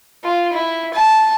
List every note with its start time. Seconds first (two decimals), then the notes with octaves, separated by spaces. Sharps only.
0.24 F4
0.53 E4
0.94 A5